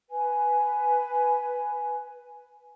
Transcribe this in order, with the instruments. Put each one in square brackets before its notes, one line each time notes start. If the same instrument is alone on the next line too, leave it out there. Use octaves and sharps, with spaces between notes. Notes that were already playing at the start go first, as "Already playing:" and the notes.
[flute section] B4 G#5